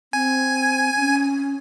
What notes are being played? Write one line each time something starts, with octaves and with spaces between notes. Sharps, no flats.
C4 G#5
C#4